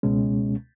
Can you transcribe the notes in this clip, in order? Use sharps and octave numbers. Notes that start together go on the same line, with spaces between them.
C#2 B2 G#3 C#4